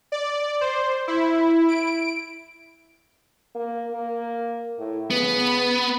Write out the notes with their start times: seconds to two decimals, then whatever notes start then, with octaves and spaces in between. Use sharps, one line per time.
0.12 D5
0.61 C5
1.08 E4
1.69 D7
3.55 A#3
3.92 A#3
4.78 A2
5.11 C#3 B3